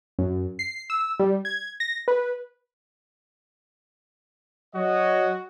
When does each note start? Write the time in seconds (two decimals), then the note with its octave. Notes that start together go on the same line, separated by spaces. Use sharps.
0.19 F#2
0.59 C7
0.90 E6
1.20 G3
1.45 G#6
1.80 A#6
2.08 B4
4.75 F#3 F#4 C#5 D#5